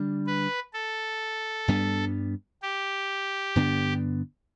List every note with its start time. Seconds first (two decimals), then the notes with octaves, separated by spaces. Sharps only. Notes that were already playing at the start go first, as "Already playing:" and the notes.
Already playing: D3 G3 D4
0.27 B4
0.74 A4
1.68 G2 G3 B3 D4
2.62 G4
3.56 G2 D3 B3 D4